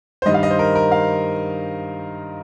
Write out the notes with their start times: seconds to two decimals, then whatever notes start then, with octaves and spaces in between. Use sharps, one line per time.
0.22 C5
0.25 G2 D#3 G3 D#5
0.34 F5
0.43 D#5
0.51 C5
0.59 A#4
0.75 A#4
0.92 F5